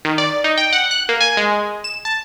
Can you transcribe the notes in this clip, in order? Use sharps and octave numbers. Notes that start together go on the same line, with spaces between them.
D#3
D5
D#4
G5
F#5
F#6
A#3
G#5
G#3
E7
A5